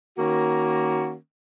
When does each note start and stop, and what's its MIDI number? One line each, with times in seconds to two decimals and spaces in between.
0.18 1.14 51
0.18 1.14 58
0.18 1.14 61
0.18 1.14 66